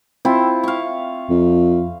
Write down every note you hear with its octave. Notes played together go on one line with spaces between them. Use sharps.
C4 E4 F4
F5 C#6
F2